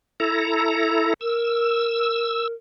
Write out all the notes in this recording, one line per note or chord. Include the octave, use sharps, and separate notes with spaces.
E4 A4 A#5
A#4 E6